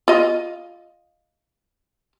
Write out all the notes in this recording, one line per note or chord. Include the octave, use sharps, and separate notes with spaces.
F4 D#5